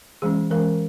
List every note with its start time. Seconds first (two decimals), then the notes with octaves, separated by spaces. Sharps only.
0.22 E3 G#3 C#4 G#4
0.51 E3 G#3 C#4 A#4